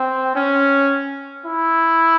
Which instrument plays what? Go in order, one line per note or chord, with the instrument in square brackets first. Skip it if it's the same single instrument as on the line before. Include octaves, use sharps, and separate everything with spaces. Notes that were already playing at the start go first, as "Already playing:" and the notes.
Already playing: [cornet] C4
C#4
E4